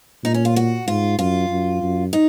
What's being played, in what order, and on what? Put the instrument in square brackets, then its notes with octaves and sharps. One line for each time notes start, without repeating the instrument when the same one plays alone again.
[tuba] A#2 [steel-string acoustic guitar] D#4
[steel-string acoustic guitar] C#4
F4
F#4
[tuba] G#2 [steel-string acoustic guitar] F4
[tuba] F#2 [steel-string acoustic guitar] F4
[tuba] F#2
F#2
[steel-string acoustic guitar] D#4